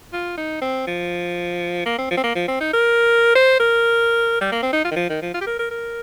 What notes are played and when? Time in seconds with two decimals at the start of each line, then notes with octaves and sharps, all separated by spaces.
0.13 F4
0.38 D#4
0.61 C4
0.87 F3
1.86 A#3
1.99 C4
2.11 F3
2.17 C4
2.24 A#3
2.35 F3
2.48 C4
2.61 D#4
2.73 A#4
3.36 C5
3.60 A#4
4.41 G3
4.52 A#3
4.63 C4
4.73 D#4
4.85 F4
4.91 D#3
4.96 F3
5.10 D#3
5.22 F3
5.34 F4
5.41 G4
5.47 A#4
5.59 A#4
5.71 A#4